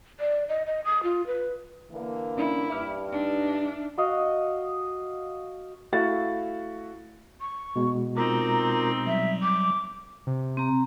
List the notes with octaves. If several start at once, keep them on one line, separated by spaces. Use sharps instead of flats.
D5
D#5
D#5
D#6
F4
B4
D3 E3 A#3
C#4 D4 E4
G2 E5 D6 F6
D4 D#4
F#4 D#5 F5
A3 E4 F#4 F5 A6
C#6
B2 G#3
C4 D#4 F4 A#4 A#5 D6
F#3 G3 E5
D6
C3
C4 A#5